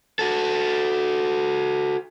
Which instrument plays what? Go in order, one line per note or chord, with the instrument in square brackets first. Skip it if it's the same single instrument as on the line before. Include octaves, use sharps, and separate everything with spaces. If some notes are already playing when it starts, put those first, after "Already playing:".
[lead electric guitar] F#4 A4